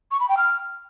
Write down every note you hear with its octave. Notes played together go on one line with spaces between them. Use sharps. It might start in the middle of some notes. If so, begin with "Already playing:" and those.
C#6
B5
G5
F6